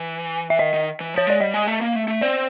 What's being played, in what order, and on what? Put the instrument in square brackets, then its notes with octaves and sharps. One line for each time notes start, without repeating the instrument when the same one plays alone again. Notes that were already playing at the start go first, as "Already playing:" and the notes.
Already playing: [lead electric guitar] E3
[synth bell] E5
[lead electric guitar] D#3 [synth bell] D#5
[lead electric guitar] D#3
E3
[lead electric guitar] F3 [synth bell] C#5
[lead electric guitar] G#3 [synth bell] D5
[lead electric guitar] G3 [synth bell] D#5
[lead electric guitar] G#3
A3
A#3
A3
A3
[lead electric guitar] C4 [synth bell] D5